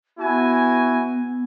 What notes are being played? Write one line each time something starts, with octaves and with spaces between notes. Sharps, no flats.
B3 E4 F#4 G#5